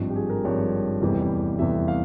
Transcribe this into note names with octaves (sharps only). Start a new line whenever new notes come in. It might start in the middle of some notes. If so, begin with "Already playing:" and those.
Already playing: G#1 G2 F3
G4
G#4
A#4
G#1 G2 F3 C#5
F1 E2 E3 G3
F1 E2 E3 G3 E5
F5